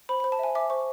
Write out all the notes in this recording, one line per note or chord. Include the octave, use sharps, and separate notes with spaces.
C5 B5
B5
C5
A5
E5 G#5
E5 D6
C5 C#6